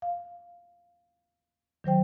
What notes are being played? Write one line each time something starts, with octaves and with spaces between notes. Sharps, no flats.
F5
D#3 F#3 C5 G5